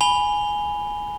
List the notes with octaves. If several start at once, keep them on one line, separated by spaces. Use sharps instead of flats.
G#5 B5 F7 G7